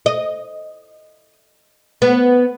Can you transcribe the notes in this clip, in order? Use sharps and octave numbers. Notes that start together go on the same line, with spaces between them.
D#5
B3